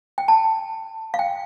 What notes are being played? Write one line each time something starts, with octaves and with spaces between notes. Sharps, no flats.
G5
A5
F5
G5